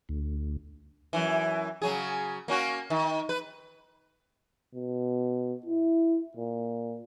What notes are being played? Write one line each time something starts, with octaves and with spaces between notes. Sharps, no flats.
D2
F#2 A2 E3
C#3 F#3 G#4
A#3 C#4 F#4
D#3
B4
B2
E4
A#2